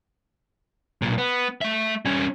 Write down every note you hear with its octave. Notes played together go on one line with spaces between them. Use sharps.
B1 A#2
B3
A3 E5
G3 C#4